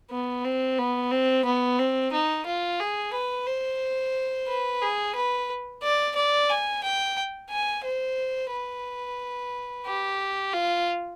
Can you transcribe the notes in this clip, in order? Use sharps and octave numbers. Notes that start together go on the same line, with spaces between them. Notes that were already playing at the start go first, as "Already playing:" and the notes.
B3
C4
B3
C4
B3
C4
D#4
F4
G#4
B4
C5
B4
G#4
B4
D5
D5
G#5
G5
G#5
C5
B4
G4
F4